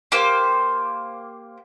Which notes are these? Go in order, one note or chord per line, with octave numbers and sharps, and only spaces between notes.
A#3 G4 C5